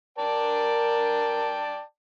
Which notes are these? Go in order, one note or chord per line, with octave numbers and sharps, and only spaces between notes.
A#4 D5 G5 A5